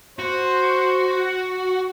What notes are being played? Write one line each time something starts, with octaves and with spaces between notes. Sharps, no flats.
F#4 C5